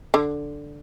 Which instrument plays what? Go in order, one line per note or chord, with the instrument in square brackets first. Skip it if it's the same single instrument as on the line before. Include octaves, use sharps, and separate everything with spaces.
[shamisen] D3